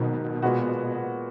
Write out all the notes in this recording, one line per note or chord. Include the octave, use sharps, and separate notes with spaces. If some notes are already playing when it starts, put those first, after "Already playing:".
Already playing: G#2 B2 D#3 F#3 A#3
A#2 G#3 B3 F#4